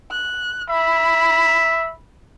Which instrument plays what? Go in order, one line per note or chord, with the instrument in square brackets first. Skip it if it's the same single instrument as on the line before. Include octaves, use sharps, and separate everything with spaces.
[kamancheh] F#6
[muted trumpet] E5 [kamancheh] B5